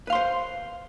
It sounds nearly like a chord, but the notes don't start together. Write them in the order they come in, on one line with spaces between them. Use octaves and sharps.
B4 F5 C6 C5